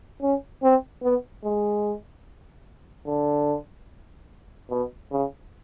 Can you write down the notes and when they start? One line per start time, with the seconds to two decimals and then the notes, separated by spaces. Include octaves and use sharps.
0.22 C#4
0.63 C4
1.03 B3
1.44 G#3
3.07 D3
4.70 B2
5.11 C#3